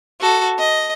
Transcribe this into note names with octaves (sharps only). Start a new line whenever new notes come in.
F#4 A4
D#5